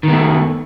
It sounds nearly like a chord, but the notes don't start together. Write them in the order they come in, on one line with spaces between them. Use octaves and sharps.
D#3 B3 A3